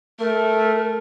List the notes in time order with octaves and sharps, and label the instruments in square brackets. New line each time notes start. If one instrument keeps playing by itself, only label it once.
[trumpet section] A3 [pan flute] A#4